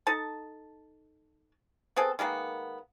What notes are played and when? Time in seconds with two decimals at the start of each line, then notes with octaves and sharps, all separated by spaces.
0.07 D#4 A4 A5
1.96 B3 C4 G#4 A4
2.19 D#3 G#3 A#3 B3